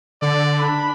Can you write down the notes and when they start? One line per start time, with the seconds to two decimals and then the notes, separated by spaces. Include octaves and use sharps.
0.22 D3 D5
0.59 D4 B5